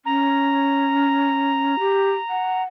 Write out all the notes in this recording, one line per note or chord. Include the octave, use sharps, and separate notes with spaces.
C#4 A#5
G4
F#5